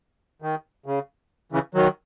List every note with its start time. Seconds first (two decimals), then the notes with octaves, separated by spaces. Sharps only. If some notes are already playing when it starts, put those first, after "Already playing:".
0.42 D#3
0.86 C#3
1.52 C#3 E3
1.74 D#3 F#3